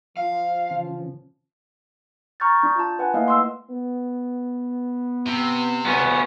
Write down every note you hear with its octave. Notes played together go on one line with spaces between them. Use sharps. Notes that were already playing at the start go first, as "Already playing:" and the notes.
F3 F5
C#3 E3 C#4
A#5 C#6 F6 G6 A6
D4 G6
F4 A5
B4 F#5 G#5
A3 A#3 E4 B4 D#5 F5
C6 E6
B3
C3
D2 B3 C#4